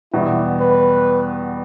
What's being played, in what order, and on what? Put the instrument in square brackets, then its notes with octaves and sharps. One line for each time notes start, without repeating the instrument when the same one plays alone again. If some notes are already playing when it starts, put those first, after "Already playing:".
[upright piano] E2 B2 G3 [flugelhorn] E4
[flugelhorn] B4